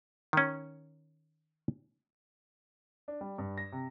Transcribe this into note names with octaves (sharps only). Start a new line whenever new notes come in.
D#3 C#4
D4
G3
G2
A#6
C3